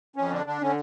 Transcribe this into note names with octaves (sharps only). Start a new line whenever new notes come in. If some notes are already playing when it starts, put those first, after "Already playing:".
F2 C#4
D3 D4
D3 D4
D3 C#4